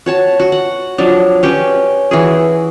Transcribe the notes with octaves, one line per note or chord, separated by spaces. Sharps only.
F#4 C#5 A5
F#4
F#5
F3 F#3 D4
C#4 G4 B4
E3 F#4 G#4